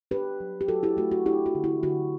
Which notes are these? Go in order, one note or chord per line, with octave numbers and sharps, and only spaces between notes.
D4 G4 B4
F#3
G4
F#3 F#4 A4
E4 G4
A3 F#4
F#4
D4 E4 G4
F#4
D3
E4
D3 F#4